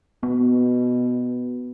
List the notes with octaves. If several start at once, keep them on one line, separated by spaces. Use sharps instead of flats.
B2 B3